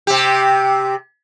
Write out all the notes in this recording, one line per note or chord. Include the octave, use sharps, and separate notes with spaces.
C3 G4